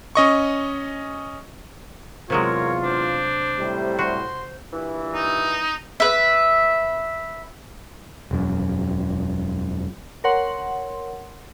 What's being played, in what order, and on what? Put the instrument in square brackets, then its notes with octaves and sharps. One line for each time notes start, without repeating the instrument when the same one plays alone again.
[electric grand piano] C#4 D#5 C#6
[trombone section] E2 F4 [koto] C3 F#3 G#3 [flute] A#4 [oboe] C#5
[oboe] D4 [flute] C5
[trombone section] A2 C3 G3
[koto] F#4 [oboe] C6
[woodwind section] G2 A#2 E3
[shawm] D#4
[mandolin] B4 E5
[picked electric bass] E1 F#2
[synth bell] A#4 C#5 F#5 C6